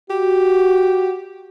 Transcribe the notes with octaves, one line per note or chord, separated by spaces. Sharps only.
F#4 G4